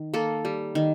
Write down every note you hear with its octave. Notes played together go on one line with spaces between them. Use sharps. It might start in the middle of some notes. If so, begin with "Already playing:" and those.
Already playing: D#3
A#3 A4
G3
D#3